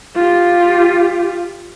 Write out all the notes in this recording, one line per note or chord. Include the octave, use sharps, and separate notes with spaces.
F4 G4